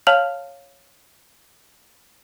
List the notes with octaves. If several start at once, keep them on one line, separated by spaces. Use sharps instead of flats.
C#5 F5 A5 F6 F7 F#7